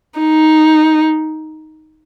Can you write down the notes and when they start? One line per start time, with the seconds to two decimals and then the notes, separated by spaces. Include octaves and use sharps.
0.19 D#4